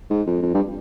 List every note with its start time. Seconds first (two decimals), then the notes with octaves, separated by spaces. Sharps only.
0.10 G#2
0.27 F2
0.42 F2
0.54 G2